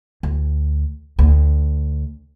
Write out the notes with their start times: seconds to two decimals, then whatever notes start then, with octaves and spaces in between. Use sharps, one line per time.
0.23 D2
1.19 D2